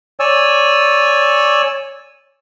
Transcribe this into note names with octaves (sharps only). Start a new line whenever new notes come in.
C#5 D5 G#5 E6